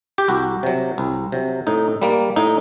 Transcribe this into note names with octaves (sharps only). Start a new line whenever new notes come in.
G4
C2 F#4
C3 F#3
C2
C3 F#3
A2 D#4
G3 A#3
A2 D#4